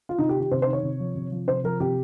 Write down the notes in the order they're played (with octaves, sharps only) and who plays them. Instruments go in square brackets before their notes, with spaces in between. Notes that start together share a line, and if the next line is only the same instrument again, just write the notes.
[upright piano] F4
C3 D#4
G4
D#3
G4
C3 C5
C5
D#3
C#5
C3
F3
C3
F3
C3 C5
F3 A#4
C3 G4